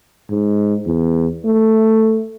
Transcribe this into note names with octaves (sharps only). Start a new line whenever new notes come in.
G#2
E2
A3